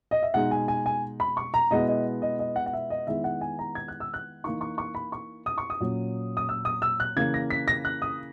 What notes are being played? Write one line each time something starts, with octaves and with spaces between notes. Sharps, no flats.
D#5
E5
B2 G#3 D#4 F#5
G#5
G#5
G#5
B5
C#6
A#5
B2 G#3 B3 E4 D#5
D#5
D#5
D#5
F#5
F#5
E5
D#5
D#3 G#3 B3 E4 E5
F#5
G#5
A#5
G#6
F#6
E6
F#6
E3 A#3 D#4 C#6
C#6
C#6
B5
C#6
D#6
C#6
D#6
A#2 F#3 C#4
D#6
E6
D#6
E6
F#6
C#3 E3 A#3 G#6
A#6
B6
A#6
F#6
D#6